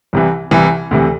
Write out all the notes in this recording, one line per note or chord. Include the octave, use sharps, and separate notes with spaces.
C2 C3 E3
C2 C3 E3
D2 C3 E3